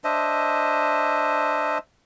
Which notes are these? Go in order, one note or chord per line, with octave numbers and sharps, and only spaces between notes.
D4 C5 D#5 E5